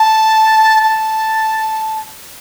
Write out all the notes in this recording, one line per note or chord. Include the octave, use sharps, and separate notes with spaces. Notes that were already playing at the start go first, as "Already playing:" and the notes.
Already playing: A5
A5